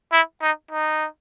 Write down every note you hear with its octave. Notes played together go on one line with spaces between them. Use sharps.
E4
D#4
D#4